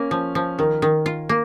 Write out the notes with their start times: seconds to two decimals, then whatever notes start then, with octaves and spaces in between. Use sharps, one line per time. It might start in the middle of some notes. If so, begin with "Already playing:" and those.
Already playing: A#3 C#4
0.11 F3
0.35 F3
0.58 D#3 A#4
0.82 D#3
1.06 F4
1.29 A#3